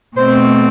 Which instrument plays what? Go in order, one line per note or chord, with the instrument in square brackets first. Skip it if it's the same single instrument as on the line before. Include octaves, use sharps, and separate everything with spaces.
[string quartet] B2 A3 C4 C5